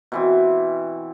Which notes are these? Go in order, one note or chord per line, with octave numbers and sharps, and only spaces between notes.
B2 E3 C4